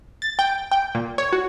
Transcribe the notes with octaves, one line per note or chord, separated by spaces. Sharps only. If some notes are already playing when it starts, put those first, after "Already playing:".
A6
G5
G5
A#2
C#5
F#4